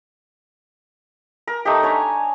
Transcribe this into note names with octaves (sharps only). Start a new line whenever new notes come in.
A#4
A3 D#4 G4
D4 C#5 G#5 A#5